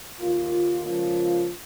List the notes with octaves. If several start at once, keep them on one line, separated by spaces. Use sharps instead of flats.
D#2 D#3 A#3 F4
C#2 C#3 F3 A#3 F4